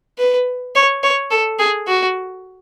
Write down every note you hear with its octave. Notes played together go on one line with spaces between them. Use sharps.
B4
C#5
C#5
A4
G#4
F#4